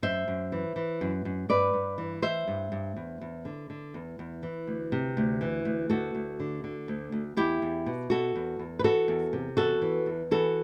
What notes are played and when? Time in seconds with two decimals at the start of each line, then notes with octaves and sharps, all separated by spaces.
0.02 F#2 C5 E5
0.28 F#2
0.52 E3
0.76 E3
1.01 F#2
1.25 F#2
1.49 G2 B4 D5
1.74 G2
1.98 E3
2.22 E3 C5 E5
2.48 G2
2.72 G2
2.96 E2
3.21 E2
3.45 D3
3.70 D3
3.94 E2
4.19 E2
4.43 E3
4.67 D2
4.92 C3
5.17 D2
5.41 E3
5.65 D2
5.90 D2 F#4 A4
6.15 D2
6.40 D3
6.64 D3
6.88 D2
7.12 D2
7.37 E2 E4 G4
7.62 E2
7.86 B2
8.10 B2 F#4 A4
8.35 E2
8.59 E2
8.79 B4
8.84 E3 F#4 A4
9.08 E2
9.33 C3
9.57 E2 F#4 A4
9.82 E3
10.06 E2
10.31 E3 F#4 A4